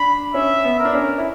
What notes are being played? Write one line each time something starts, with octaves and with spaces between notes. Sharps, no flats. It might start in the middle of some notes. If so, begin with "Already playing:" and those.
Already playing: D4 B5
C#4 E5
B3
A#4
D4
C#4
E4